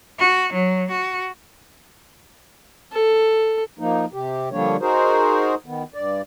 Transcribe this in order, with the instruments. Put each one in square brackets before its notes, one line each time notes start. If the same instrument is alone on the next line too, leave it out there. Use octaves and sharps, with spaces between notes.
[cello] F#4
F#3
F#4
[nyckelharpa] A4
[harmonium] F3 A#3 D#4
C3 G4
D3 F3 G3 A#3 D4 C#5
D#4 F#4 G#4 A#4 C5
D#3 B3
G2 D5